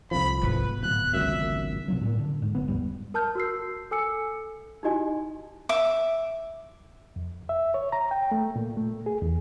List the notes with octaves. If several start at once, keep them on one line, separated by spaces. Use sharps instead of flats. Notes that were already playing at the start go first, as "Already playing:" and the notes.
C2 F2 F3 B5
G#2 B2 B4
D1 F#6
G#1 C#2 F#2 E5
B2 F3 F#3
A2 A3 A#3
D3
G#2
F#1 B3
E1 A1 F2 G3
A#4 A5 F6 G6
F#4 A#4 E6 C7
A4 G#5 E6 C#7
D#4 E4 F#4 G4 D#5 G#5
E5 D6
F2
E5
C#5
A#5
G5
A3
A#2
A3
G#4
E2